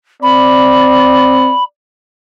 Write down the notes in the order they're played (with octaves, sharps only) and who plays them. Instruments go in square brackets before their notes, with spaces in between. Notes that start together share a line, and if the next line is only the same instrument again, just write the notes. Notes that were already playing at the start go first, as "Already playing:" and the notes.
[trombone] C4 [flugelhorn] D5 [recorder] B5